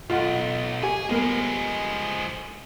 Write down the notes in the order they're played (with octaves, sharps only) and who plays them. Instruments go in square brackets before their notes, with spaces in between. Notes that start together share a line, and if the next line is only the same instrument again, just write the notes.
[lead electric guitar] B1 [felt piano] F4 [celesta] A4 D#5 F#5
[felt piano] G4 G#5 [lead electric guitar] G#4
[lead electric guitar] F3 G#3 [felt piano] G3 B3 A#4